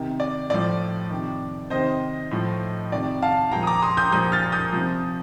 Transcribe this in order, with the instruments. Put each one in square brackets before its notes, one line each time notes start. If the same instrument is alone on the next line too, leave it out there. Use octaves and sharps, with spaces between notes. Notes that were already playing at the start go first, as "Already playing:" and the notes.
Already playing: [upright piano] C3 D#3
D5
A2 F3 D5
C3 D#3
C3 D#3 C5 D#5
A2 F3
C3 D#3 D5
F5 A5
A#2 F3 G5 A#5
D#6
A#5 D6
C6 D#6
D#6 G6
A#2 F3 D#6 G6
F6 A6
D#6 G6
C3 F3